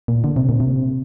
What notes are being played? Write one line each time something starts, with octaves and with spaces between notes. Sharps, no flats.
A#2
D3
C3
A#2
C3